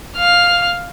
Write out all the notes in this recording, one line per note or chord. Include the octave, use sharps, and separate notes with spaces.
F5 F6